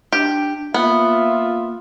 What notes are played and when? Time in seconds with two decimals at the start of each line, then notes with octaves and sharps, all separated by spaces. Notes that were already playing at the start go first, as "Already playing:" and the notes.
0.13 D4 G4
0.74 A#3 B3 F4 E5